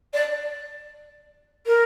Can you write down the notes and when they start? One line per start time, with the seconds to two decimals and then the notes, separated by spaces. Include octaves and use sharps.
0.13 D5
1.66 A#4